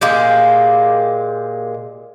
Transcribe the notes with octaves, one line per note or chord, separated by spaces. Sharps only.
A#2 G#3 G4